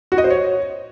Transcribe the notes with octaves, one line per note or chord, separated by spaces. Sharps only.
F#4
D#5
C5
C#5